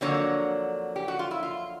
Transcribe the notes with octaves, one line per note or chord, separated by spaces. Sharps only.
F2 D3 F#3 A#3 C#5
G4
F#4
F4
E4
F4